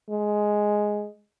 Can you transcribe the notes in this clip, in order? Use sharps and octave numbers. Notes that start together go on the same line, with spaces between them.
G#3